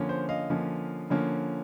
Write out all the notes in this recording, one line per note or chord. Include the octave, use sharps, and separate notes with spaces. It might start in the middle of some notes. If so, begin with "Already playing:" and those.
Already playing: D3 F3 A#3 C#4
C5
D#5 F5
D3 F3 A#3 C#4
D3 F3 A#3 C#4